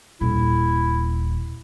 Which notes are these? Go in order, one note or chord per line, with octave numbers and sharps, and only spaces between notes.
D#1 E4